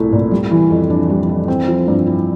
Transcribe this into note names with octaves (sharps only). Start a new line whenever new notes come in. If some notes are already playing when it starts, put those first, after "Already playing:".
Already playing: C2 A#2 A3 E4
A#2
G3
E3
F2
D4
G3
E3
C4
F3
G2
E4